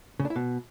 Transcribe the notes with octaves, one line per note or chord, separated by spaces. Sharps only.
C#3
D4
E4
B2